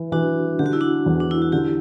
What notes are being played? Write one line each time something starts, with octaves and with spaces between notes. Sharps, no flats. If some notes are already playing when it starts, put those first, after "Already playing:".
Already playing: E3
E3 D4 F#4
D3 G4
F#4
E4
D4 F#4
E2
D4
E4
F#4
D3 E4 G4